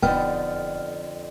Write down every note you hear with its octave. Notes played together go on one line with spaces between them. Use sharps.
E1 F2 D3 B3 D#4 G5 F6